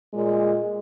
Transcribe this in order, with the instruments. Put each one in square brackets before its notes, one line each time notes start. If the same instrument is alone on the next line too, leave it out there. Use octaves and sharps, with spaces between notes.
[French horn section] A#2 G#3